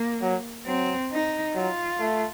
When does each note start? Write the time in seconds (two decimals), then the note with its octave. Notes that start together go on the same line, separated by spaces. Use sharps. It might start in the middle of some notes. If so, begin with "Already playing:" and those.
Already playing: A#3
0.22 F#3
0.66 F#3 C4
1.12 D#4
1.56 F#3 F4
2.00 A3